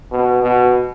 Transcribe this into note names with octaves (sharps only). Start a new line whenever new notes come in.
B2
B2